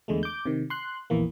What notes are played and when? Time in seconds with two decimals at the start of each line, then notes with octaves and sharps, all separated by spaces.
0.08 E2 D3 G#3 A3
0.23 D6 G6
0.46 C3 D#3
0.70 C6 F#6
1.10 A#1 E2 E3 A#3